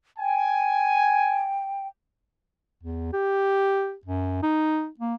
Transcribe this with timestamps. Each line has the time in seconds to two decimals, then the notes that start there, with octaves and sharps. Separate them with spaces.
0.19 G5 G#5
2.83 E2
3.13 G4
4.05 F#2
4.43 D#4
5.00 A#3